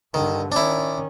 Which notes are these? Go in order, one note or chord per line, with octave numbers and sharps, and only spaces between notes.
G2 D3 D#3
D#3 C#4 D4 E4